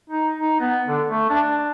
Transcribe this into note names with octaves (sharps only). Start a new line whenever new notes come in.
D#4
D#4
B3
D3
A3
D4